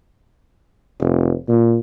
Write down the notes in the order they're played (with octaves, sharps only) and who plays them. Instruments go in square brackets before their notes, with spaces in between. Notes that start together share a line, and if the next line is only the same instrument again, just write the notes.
[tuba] F1
A#2